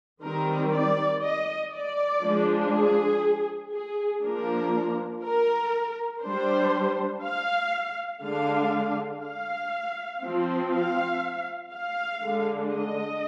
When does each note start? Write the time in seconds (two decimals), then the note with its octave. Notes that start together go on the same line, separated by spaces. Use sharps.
0.21 D#3 G3 C4 A#4
0.71 D5
1.21 D#5
1.72 D5
2.21 F3 G#3 D4
2.72 G#4
3.72 G#4
4.21 F3 A#3 D4 A#4
5.22 A#4
6.21 G3 D4 C5
7.22 F5
8.21 D3 G#3 D4 F5
9.22 F5
10.22 F3 C4
10.71 F5
11.71 F5
12.22 D3 G#3 D4
12.71 D#5